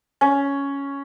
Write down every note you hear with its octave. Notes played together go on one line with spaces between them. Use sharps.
C#4